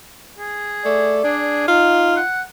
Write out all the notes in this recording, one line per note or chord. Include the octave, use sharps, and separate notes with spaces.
G#4
A3 D5
D4 G#4
D#4 F4 F5
F#5